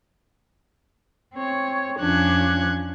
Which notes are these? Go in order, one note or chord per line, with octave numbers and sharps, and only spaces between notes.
C4 C#5
F2 F3 C#4 D4 F#6 G#6